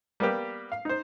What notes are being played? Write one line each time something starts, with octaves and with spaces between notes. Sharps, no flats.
G3 A#3 B3 G4
F5
D#4 C5